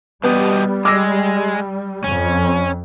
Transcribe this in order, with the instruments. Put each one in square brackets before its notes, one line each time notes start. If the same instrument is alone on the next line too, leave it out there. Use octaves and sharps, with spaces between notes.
[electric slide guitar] B2 G4 D#5 [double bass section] G3 [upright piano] B3
[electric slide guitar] G#3 [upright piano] D6 E6 A#6
[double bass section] F2 [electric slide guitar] C#4